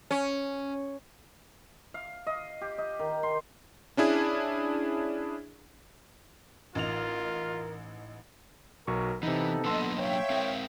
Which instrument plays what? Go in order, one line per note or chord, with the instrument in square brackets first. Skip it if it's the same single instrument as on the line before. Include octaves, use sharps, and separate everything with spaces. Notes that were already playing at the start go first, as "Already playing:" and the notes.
[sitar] C#4
[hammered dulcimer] F5
D#5
G4
D#5
D#3
C6
[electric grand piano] C#4 D4 E4 G#4
[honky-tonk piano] A1 D#4 F7 [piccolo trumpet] F4 [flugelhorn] A#4
[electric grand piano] B1 F#3 C#6 [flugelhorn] A#4
[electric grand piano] C3 D#4 [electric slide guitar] E3 [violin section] B3 [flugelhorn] A4
[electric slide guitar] F#3 A#3 D4 [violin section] B3 D#5 [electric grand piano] A5 C6 E6
[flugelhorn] C#5 [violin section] E5 F5 G5
[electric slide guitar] C4 A#4 C5